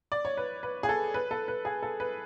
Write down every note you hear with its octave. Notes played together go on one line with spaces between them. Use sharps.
D5
C#5
B4
B4
G#4
A4
B4
A4
B4
G#4
A4
B4